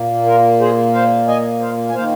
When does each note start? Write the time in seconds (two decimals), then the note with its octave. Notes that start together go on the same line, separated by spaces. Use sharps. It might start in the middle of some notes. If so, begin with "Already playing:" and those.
Already playing: A#2 A#3
0.26 F4 A#4
0.60 G#4 C5
0.93 C5 F5
1.27 D#5 G#5
1.60 C5 F5
1.89 G#5
1.94 D#3 A#3 C5 F5